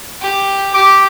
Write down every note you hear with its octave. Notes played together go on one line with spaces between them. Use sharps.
G4
G4 D6